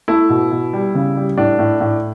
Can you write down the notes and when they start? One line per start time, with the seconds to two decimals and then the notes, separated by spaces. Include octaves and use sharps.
0.08 A3 E4
0.29 B2
0.51 B2
0.73 G3
0.94 C#3
1.16 G3
1.37 A2 D4
1.59 A2
1.80 A2